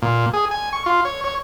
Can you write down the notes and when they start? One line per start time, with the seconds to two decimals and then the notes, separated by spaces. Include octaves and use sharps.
0.02 A#2
0.33 G#4
0.51 G#5
0.73 C#6
0.86 F4
1.05 C#5
1.24 C#5